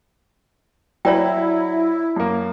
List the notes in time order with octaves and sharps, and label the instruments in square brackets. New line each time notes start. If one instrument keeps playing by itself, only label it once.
[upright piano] F#3 [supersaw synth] E4 [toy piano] C#5 D5 G5
[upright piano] F#2 A#3